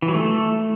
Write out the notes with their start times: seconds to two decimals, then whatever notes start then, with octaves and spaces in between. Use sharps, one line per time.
0.02 E3
0.08 F#3
0.14 A3